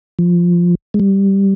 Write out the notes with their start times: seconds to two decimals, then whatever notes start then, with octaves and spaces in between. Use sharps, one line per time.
0.19 F3
0.94 G#3
1.00 G3